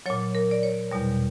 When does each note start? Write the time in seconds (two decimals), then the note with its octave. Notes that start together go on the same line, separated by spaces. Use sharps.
0.06 A#2 F#3 C#5
0.35 A#4
0.51 D5
0.63 C#5
0.91 E2 B2 G3